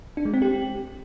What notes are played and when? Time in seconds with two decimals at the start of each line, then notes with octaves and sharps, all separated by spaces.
0.17 D4
0.25 G#3
0.34 C4
0.42 G4